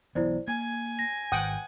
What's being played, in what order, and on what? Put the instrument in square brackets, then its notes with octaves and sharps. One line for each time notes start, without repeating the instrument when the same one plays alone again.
[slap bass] B1 E3 B3 [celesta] E4 C5 D5
[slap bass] A#3 [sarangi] G#5 [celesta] G#6
[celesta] A#6
[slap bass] G#1 [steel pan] F#5 G5 D#6